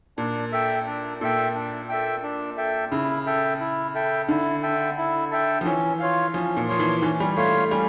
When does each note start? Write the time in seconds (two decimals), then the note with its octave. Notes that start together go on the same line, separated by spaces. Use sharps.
0.18 A#2 D4
0.52 A4 E5 G5
0.86 D4
1.20 A#2 A4 E5 G5
1.54 D4
1.89 A4 E5 G5
2.23 D4
2.57 A4 E5 G5
2.91 C#3 E4
3.26 A4 E5 G5
3.60 E4
3.95 A4 E5 G5
4.29 D3 E4
4.63 A4 E5 G5
4.97 E4
5.31 A4 E5 G5
5.61 F3
5.66 E3 C#4
6.00 F4 C#5 F5
6.34 F3 C#4
6.57 A#2
6.68 F3 F4 C#5 F5
6.79 E3
7.02 E3 C#4
7.20 G3
7.37 A3 F4 C#5 F5
7.54 A3
7.71 G3 C#4